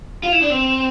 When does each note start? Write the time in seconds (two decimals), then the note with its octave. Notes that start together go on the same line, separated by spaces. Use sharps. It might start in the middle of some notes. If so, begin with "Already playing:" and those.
0.23 F4
0.32 E4
0.41 D4
0.50 C4